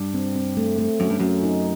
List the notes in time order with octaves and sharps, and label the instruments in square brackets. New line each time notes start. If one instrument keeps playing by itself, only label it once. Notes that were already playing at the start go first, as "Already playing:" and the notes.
Already playing: [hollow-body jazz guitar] G2
[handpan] C4
C4
A3
A3
[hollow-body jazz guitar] F#2 [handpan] C#4
[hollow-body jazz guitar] G2
[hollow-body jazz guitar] F#2 [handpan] C#4
[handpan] D#4